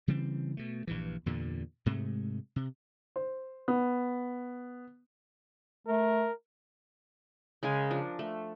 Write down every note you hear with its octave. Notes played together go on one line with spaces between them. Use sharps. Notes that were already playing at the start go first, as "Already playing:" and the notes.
C#3 E3 G3 C4
B2 A3
A#1 G2 E3
E2 G2 A#2 D3
G#2 C3 G#3 A3
C3
C5
B3
A3 A#4
C#3 G#3 A#4 G#5
F3 D4
A3